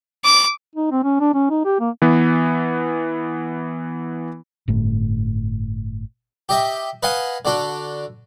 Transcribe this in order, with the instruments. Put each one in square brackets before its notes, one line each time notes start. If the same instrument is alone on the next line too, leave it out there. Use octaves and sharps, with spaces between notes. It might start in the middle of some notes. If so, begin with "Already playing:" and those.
[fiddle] D6
[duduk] D#4
C4
C#4
D4
C#4
D#4
G4
A#3
[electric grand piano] E3 B3
[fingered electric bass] G1 A2
[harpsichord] G4 D#5 E5
B4 D#5 F5 F#5 G#5
D3 D4 F#4 A4